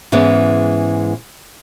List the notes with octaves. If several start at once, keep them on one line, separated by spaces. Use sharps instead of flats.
G#2 E3 G#3 B3 C#4